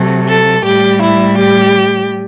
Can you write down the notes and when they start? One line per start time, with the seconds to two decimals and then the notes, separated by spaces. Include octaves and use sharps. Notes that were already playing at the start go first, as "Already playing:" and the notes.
Already playing: C3 F#3 A3
0.27 A4
0.64 A2 G3 G4
1.01 E4
1.38 G4